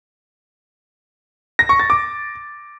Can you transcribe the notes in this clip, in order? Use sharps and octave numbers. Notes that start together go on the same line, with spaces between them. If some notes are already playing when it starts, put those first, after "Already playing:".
A#6
C#6
A6
D6